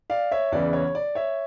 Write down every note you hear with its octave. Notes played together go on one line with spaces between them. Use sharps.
D5 F5
C#5 E5
E2 C#3 E3 D5
C#5
D5
C#5 E5